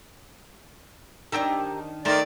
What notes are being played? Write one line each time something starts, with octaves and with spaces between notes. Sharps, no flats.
D#3 D4 G4 A#5 E6
D#3 A3 A#4 C5 D5 A#5